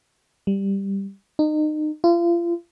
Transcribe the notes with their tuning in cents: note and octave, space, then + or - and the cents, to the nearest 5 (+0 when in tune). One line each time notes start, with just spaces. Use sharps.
G3 +5
D#4 -30
F4 -35